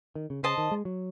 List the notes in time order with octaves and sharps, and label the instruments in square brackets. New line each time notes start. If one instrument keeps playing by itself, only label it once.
[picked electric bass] D#3
C#3
[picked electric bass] C#3 [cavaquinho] C5 D#5 A5
[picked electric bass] D#3
G#3
F#3